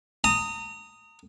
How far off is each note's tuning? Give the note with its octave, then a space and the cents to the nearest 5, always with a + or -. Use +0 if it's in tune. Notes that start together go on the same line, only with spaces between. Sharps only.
A#5 -35 D#6 +0